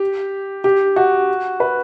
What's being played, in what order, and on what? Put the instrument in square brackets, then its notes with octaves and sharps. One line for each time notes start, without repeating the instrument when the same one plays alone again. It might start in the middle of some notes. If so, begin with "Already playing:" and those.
Already playing: [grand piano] G4
G4
F#4
B4